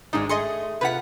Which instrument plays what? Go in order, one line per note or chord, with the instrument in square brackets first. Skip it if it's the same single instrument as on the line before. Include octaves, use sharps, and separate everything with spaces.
[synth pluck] G#1 G#2 D#4 [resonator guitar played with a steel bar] F#3 G#3 D4
[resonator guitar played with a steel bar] A3 G#4 [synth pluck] D#5 C6 C#7
[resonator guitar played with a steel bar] C3 F4 F#5 [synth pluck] B4 B6